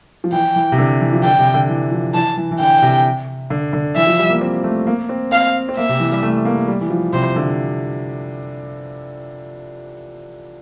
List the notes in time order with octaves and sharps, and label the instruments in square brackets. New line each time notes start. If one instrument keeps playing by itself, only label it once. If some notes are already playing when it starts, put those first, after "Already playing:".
[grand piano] F3
[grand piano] E3 [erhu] G5
[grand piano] E3
C3
D3
E3
F3
[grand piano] D3 [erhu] G5
[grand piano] C3
D3
E3
F3
[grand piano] E3 [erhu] A5
[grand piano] E3
E3
[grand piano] D3 [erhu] G5
[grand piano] C3
D3
D3
[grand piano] E3 [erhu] E5
[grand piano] F3
G3
A#3
C4
A3
A#3
C4
[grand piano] C4 [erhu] F5
[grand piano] C4
[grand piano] A#3 [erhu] E5
[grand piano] C3
E3
G3
A3
A#3
G3
E3
F3
[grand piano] C3 [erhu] C5
[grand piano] D3